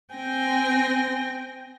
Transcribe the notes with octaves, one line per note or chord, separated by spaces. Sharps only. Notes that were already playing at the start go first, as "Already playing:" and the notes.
C4 G5 G#5 A#6